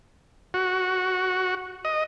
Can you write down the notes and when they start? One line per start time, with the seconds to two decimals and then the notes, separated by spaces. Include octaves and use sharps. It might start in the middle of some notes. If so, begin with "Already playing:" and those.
0.54 F#4
1.85 D#5